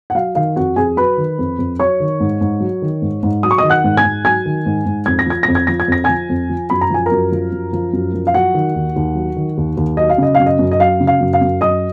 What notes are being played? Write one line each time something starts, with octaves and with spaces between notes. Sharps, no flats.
F#5
F#3 F5
D#3 F5
F2 F#4 F#5
F2 G#4 G#5
F#3 B4 B5
D#3
F2
F2
F#3 C#5 C#6
D#3
G#2
G#2
F#3
D#3
G#2
G#2
F#3 D#6
C#6
D#3 D#5 D#6
F#5 F#6
G#2
G#5 G#6
G#2
F#3 G#5 G#6
D#3
G#2
G#2
F2 G#6
A#6
F3 G#6
F2 A#6
G#6
F3 A#6
G#6
F2 A#6
F3 G#5 G#6
F2
F3
F#2 B5
A#5
F3 G#5
A#4 A#5
F#2
F3
F#2
F3
F#2
F3
F5
F#3 F#4 F#5
D#3
D#2
D#2
F#3
D#3
D#2
D#2
F#3 D#5
F5
C#3 D#5
F#2 F5
D#5
F#2
D#5
F#3 F5
C#3
F5
F#2
F5
F#2
F#3 D#5 D#6